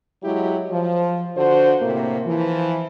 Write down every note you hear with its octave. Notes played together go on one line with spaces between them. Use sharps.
F#3 G#3 E4 G4
F3
D3 F#4 C5
A2 C3 A#3
E3 F3